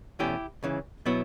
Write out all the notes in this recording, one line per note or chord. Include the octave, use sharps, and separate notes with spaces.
E2 B2 A3 C#4 E4 G4
C#2 C#3 E3
B2 F#3 B3 E4